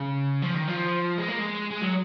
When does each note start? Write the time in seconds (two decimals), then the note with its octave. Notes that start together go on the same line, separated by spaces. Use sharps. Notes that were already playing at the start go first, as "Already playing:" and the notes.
Already playing: C#3
0.42 F3
0.55 D#3
0.68 F3
1.18 G#3
1.28 A#3
1.39 G#3
1.71 G#3
1.82 F#3